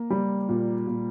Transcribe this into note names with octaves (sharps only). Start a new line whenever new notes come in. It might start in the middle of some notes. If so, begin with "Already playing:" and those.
Already playing: A#3
G3
A#2
A#2